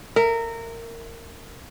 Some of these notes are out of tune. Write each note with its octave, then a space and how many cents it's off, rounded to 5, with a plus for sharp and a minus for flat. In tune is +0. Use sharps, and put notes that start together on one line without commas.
A#4 -20 E5 +5